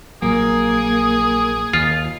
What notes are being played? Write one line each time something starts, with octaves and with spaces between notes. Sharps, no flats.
A#1 A#2 F#3 A#3 G#4
D#2 F4